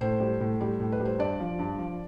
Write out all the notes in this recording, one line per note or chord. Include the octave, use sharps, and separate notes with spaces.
A2 C5
G3
A2
G3
A2
B4
G3
C5
G2 D5
F3
G2
F3